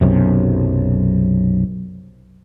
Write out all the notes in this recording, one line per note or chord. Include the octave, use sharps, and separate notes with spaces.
B1 F#2 C3